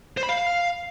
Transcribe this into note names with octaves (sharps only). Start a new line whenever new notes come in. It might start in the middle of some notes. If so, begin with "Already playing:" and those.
C5
B5
F5